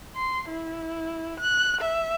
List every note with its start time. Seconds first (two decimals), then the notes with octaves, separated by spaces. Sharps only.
0.16 C6
0.49 E4
1.40 F#6
1.81 E5